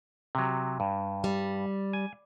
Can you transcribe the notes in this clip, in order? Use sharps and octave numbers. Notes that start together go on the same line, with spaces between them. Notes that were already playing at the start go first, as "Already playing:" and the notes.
C3 F#3
G2
G3
G#5